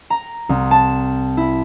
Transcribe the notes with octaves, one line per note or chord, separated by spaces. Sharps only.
A#5
C2
A5
E4